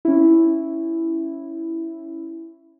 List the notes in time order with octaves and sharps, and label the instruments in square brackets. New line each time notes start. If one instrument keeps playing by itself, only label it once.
[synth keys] C#4 E4